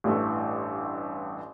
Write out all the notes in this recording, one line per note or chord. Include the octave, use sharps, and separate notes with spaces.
A1 G2 E3 A3